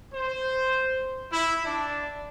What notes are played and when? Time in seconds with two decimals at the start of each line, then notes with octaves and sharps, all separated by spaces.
0.14 C5
1.31 E4
1.65 D4